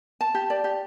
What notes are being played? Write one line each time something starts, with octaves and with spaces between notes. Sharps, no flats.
A5
G4
D5
G4